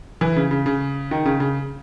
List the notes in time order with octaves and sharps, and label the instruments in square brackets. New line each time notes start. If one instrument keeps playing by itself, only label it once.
[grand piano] E3
C#3
C#3
C#3
D#3
C#3
C#3